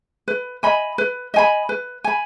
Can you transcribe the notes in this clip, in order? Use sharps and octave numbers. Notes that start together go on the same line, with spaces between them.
B4
D#5 G#5 B5
B4
D#5 G#5 B5
B4
G#5 B5